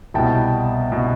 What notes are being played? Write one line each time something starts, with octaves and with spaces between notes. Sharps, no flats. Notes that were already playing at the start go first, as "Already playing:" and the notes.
C2 B2 G5 A5
B2